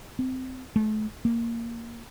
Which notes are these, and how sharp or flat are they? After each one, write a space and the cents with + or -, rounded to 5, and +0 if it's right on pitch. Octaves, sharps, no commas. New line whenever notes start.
C4 -15
A3 -35
A#3 -5